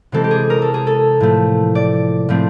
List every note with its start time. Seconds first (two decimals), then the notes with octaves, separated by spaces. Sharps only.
0.12 C3 E3 G#3 C4 A4
0.24 G4
0.31 G#4
0.50 A#4
0.62 A4
0.74 G#4
0.87 A4
1.20 A2 F3 A3
1.75 D5
2.29 A2 F3 A3 C4